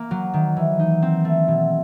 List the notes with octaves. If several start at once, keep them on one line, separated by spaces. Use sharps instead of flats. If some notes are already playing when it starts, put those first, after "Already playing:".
Already playing: A#3
F#3
D#3
E3
D#4
C4
A3
B2